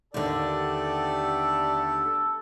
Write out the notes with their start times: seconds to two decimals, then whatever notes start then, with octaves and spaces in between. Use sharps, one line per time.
0.14 D#2 D3 A3 B3 G4 A4 D5